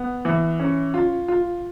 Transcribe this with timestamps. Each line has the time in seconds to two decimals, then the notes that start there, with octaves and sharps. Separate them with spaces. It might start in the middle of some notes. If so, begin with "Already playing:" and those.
Already playing: B3
0.25 E3
0.59 C#4
0.94 F4
1.28 F4